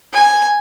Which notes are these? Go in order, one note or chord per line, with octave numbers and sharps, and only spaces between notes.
G#5